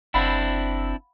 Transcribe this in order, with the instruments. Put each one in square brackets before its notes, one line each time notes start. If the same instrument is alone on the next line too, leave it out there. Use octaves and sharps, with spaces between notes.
[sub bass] F#1 [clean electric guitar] C4 D4 E4 [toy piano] F5 F#5 B5